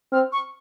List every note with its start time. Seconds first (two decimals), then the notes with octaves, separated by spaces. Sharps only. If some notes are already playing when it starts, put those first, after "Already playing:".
0.12 C4 F6
0.32 C#6